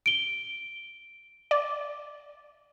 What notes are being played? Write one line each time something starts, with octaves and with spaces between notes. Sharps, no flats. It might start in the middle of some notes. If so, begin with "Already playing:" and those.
D7 G7
D5